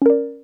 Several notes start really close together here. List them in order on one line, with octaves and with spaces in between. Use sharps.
C#4 A#4 D5